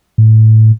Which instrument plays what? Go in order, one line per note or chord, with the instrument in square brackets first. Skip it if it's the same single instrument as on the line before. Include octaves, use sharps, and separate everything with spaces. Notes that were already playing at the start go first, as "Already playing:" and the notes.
[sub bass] A2